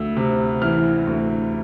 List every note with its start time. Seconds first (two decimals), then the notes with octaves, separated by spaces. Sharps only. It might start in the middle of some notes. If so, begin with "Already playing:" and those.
Already playing: D2 E6
0.16 C3
0.62 E3 F6
1.07 D2